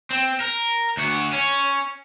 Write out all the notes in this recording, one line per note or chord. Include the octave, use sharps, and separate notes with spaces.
C4
A#4
D2 F#4
C#4